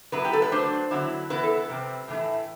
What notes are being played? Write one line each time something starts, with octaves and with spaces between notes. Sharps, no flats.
F#3 B3 E4 B4
G4
A4
B4
F#3 A3 D4 C5
D3 F#3 B3 E4
E3 B3 E4 B4
A4
B4
C3 G3 C4
A2 E3 A3 E4